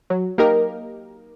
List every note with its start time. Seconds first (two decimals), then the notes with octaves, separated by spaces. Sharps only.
0.10 F#3
0.38 A#3 D#4 G4 A#4